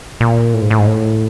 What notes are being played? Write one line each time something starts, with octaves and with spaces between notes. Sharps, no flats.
A#2
A2
G#2
A2
G#2
A2